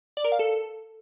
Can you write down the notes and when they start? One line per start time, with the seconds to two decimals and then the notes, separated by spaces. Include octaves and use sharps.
0.17 D5
0.24 A#4
0.32 F5
0.39 A4